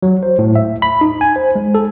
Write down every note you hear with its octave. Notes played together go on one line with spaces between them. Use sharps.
F#3
C5
A2
E5
B5
D#4
G#5
C5
G#3
A4